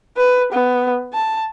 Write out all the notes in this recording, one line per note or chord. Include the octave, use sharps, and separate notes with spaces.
B4
B3
A5